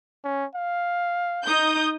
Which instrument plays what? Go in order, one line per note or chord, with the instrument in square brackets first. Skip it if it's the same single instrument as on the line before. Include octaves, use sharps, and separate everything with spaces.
[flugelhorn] C#4
F5
[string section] D#4 D#6 G6